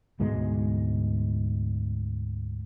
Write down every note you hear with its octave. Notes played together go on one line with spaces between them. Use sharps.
D2 G#2 B2 G#3